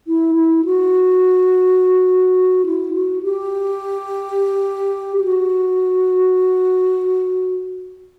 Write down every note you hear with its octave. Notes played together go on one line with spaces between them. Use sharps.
E4
E4
F#4
E4
F#4
G4
G4
F#4